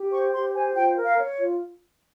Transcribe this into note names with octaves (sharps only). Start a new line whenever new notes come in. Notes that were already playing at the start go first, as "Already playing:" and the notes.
Already playing: G4
C5 C#6
G4 C6
C5 G#5
F4 G5
A#4
F5
C#5
F4